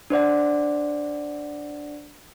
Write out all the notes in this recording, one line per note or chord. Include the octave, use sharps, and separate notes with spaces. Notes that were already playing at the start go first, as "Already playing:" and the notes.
D4 C5 D5 F#5